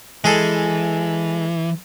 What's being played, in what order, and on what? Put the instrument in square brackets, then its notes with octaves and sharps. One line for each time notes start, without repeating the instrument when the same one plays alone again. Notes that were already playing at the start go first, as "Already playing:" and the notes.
[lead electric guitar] E3 [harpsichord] G#3 G#4 A4